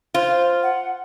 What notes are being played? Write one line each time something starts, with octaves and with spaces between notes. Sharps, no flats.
F4 C5
F#5